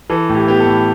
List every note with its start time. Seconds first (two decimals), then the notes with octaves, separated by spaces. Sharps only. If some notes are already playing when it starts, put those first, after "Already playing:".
0.10 E3 A4
0.29 A2
0.34 G4
0.48 B3 G4
0.60 A4
0.67 A2